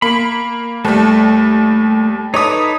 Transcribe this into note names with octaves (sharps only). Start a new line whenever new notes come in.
A#3 B5
D#2 G3 A3
D#4 A4 B4 C#5 D#6